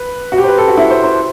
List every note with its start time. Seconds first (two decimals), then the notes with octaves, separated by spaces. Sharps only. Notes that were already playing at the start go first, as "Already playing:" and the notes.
Already playing: B4
0.32 F#4
0.38 G4
0.44 C5
0.48 B4
0.58 A4
0.68 F#4
0.77 E4
0.91 C5
1.04 C5